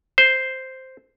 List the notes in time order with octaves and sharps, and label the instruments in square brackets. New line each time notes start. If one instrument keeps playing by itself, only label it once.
[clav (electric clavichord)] C5